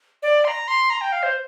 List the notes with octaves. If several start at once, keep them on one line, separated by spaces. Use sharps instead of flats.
D5
C6
A#5
C6
A#5
G5
F5
C5